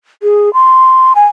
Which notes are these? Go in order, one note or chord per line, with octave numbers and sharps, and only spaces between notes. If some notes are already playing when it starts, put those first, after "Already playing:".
G#4
C6
G#5